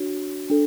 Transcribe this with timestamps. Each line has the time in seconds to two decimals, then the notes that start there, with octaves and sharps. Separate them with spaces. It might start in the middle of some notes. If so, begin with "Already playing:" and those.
Already playing: D4 F#4 C#5
0.50 D4 A4